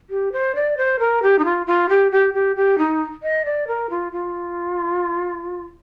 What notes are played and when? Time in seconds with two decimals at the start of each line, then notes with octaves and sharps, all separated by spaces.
0.10 G4
0.32 C5
0.55 D5
0.77 C5
0.99 A#4
1.22 G4
1.39 D#4
1.45 F4
1.67 F4
1.89 G4
2.12 G4
2.34 G4
2.56 G4
2.78 D#4
3.23 D#5
3.45 D5
3.67 A#4
3.90 F4
4.12 F4